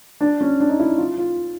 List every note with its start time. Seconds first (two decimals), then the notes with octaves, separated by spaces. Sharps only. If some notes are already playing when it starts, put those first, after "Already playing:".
0.21 D4
0.41 C#4
0.60 D4
0.69 D#4
0.79 E4
0.98 F4
1.18 F4